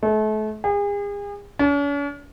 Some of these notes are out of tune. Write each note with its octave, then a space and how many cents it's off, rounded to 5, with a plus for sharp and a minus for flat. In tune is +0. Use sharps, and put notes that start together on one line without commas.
A3 -35
G#4 -40
C#4 +45